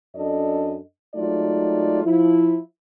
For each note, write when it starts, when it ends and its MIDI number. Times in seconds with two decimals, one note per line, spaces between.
0.15 0.77 42
0.15 0.77 62
0.15 0.77 69
0.15 0.77 74
0.15 0.77 75
1.15 2.02 54
1.15 2.02 56
1.15 2.02 57
1.15 2.02 63
1.15 2.02 65
1.15 2.02 74
2.04 2.57 53
2.04 2.57 64